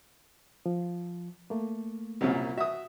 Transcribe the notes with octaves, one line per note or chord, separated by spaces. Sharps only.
F3
A3 A#3
C2 F#2 A#2 G3
F#4 E5 D#6